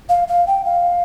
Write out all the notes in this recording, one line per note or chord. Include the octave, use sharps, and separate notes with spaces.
F5
F5
G5
F5